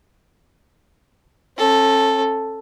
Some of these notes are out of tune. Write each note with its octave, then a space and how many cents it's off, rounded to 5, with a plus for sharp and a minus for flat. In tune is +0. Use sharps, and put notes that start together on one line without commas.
C#4 -45 A4 +0